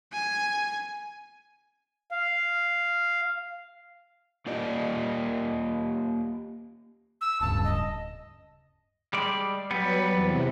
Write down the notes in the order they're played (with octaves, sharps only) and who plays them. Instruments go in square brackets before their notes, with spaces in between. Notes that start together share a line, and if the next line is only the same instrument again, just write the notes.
[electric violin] G#5
[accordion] F5
[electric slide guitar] A#3 F4 G4 D5 D#5
[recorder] E6
[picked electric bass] D1 G2 C#3 [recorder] A5
[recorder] D#5
[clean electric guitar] G3 G#3 D5
[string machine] F#3 B4 [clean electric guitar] G3 B3
[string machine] E2 C3